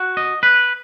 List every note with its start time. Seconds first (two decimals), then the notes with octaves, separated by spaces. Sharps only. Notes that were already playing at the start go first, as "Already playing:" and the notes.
Already playing: F#4
0.17 D#5
0.43 B4